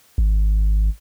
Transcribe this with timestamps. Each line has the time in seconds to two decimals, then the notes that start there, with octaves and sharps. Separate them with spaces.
0.18 G#1